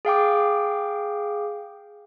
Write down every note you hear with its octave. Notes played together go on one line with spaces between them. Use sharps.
G#4 F5 G5 D6